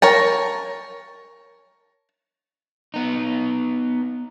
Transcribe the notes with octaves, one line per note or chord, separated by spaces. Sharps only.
A#4 C#5 A5
B3 D#4